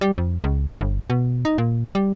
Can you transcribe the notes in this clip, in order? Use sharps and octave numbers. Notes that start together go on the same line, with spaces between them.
G3
F2
C#2
G1
B2
D#4
A#2
G3